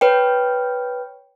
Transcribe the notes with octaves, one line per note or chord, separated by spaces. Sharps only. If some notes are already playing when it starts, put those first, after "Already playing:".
B4 C#5 G5